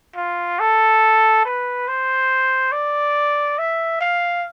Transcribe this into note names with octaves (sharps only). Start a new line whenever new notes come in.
F4
A4
B4
C5
D5
E5
F5